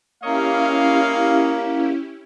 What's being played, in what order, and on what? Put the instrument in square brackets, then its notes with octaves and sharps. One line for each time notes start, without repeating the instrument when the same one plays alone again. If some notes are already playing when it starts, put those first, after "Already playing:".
[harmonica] A#3 [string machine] C#4 E4 G4 [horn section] C#5 D#5 F5